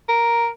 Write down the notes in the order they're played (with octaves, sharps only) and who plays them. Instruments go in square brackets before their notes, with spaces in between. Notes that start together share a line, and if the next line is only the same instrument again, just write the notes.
[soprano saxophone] A#4